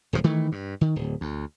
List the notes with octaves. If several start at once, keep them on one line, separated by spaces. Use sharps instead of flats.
D#1 D2 G#2 F3
D#3 E3 A3
G2
D#3
D1
D2